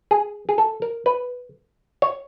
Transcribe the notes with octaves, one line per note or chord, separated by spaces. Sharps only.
G#4
G#4
A4
A#4
B4
C#5